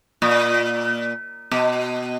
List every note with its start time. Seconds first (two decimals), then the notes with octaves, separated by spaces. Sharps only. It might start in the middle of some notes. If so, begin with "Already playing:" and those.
0.22 A#2
1.51 B2